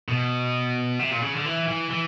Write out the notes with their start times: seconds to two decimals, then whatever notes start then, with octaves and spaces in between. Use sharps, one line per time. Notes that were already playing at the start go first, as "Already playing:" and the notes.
0.08 B2
0.99 C3
1.11 A#2
1.22 C#3
1.34 D3
1.46 E3
1.68 E3
1.90 E3